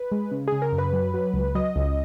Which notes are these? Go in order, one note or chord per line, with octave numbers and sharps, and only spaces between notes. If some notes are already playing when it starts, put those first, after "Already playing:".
Already playing: B4
G#3
C#3
C#3 G#4
A#4
F#2
B4
F#3
F#3
C#2
F#3 D#5
C#2